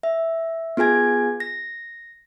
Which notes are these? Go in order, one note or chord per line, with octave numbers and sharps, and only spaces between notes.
E5
B3 F4 G#4 G#5 G#6
A#6